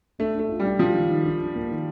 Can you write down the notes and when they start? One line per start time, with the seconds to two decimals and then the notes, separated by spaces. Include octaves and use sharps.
0.19 A3 D4
0.35 A3 D4
0.49 F4
0.59 G3
0.65 D4
0.79 F3 D4
0.95 D#3
1.09 D#3
1.25 D4
1.41 D4
1.55 A#3
1.71 D#3